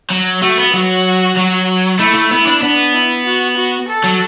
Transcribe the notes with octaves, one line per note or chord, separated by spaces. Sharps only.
F#3
A3 F#4
B3
F#3 F#4
F#3
A3 E4
A3
B3 E4
D4
B3 D4
E4
F#4
F#4
A4
F#3